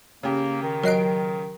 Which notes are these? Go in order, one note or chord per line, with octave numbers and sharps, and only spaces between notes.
C#3 A#3 G4
D#3
F#3 A#4 D#5 F#6 C7 D7